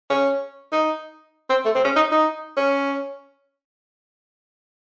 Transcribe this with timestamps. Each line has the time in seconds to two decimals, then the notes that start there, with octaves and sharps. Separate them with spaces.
0.10 C#4
0.72 D#4
1.50 C4
1.65 A3
1.75 C4
1.85 C#4
1.96 D#4
2.12 D#4
2.57 C#4